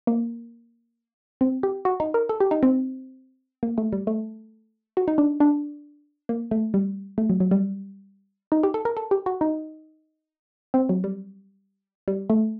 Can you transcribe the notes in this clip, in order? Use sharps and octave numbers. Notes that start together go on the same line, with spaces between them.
A#3
C4
G4
F#4
D#4
A#4
A4
G4
D#4
C4
A#3
A3
G3
A3
F#4
D#4
D4
D4
A#3
A3
G3
A3
F#3
F#3
G3
D#4
G4
A4
A#4
A4
G4
F#4
D#4
C4
F#3
G3
G3
A3